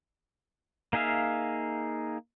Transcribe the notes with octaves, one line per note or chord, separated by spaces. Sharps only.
A#3 D#4 G#4 E5 F5